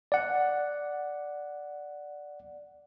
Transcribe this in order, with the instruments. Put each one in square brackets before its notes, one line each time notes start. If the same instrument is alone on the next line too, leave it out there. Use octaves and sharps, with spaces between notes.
[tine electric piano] D5 F#5